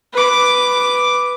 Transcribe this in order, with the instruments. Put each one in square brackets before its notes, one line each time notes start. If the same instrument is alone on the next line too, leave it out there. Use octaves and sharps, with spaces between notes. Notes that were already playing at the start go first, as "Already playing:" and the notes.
[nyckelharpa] B4 D6